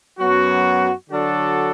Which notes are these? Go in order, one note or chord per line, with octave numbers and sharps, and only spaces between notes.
F#2 F#3 B3 F#4
D3 F#3 D4 F#4 A4